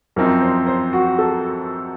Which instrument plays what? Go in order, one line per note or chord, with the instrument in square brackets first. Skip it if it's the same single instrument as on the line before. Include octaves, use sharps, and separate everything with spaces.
[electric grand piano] F#2 F3 C4 D#4 [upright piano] A#4
[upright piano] C5
C5
F#4
A4